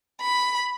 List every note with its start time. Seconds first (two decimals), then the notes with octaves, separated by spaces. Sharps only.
0.21 B5